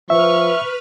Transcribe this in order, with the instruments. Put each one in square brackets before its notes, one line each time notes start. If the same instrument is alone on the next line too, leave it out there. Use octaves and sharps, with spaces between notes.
[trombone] F3 [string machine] B4 F6 [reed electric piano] E5 [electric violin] C#6